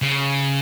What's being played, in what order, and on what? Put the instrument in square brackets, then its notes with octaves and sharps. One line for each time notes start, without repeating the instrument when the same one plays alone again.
[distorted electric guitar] C#3